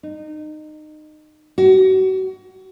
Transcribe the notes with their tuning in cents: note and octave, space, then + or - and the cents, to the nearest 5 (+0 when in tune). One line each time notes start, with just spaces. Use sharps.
D#4 -25
F#4 +30